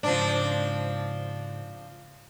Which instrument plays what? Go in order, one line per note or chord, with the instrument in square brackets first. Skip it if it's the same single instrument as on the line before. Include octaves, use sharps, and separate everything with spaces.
[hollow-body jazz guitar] G#2 C#3 [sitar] F3 C4 D4